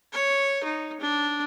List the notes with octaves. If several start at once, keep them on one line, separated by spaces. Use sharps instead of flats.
C#5
D#4
D4